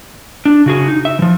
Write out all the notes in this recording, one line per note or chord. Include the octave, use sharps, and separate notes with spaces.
D4
C#3 F#4 G#4
D#4
E5
E3 F3